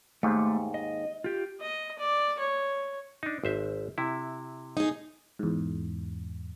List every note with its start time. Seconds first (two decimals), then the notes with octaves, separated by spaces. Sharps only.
0.23 D#2 G#2 A3
0.74 D#5
1.24 F4 G4
1.60 D#5
1.98 D5
2.39 C#5
3.23 D4 D#4
3.44 G#1 C5 E5
3.98 C3 E4
4.77 D#4 G#4
5.39 E2 G#2